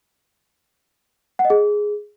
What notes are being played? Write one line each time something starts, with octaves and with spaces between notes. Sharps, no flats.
F#5
D#5
G#4